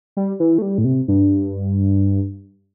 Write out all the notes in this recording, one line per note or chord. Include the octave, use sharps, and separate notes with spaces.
G3
E3
A3
G3
A2
C3
G2